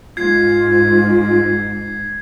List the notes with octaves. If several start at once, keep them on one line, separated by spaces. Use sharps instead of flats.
G#2 F4 G#6 C7